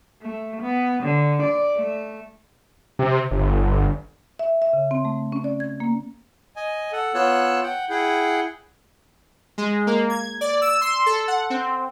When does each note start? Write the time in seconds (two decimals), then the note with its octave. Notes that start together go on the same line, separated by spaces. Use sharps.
0.21 A3
0.61 B3
1.03 D3
1.42 D5
1.75 A3
2.99 C3
3.31 G1
4.39 E5
4.62 E5
4.73 C#3
4.91 C4
5.05 A3
5.32 C#4
5.44 D5
5.60 G#6
5.80 A#3
6.56 D#5 G#5
6.92 A4 F#5
7.14 B3 F4 C#5 A5 E6 F#6
7.63 F#5 G5
7.90 E4 G#4 F#5 G5
9.58 G#3
9.87 A#3
10.10 G#6
10.41 D5
10.61 E6
10.81 C6
11.06 A4
11.28 F#5
11.50 C4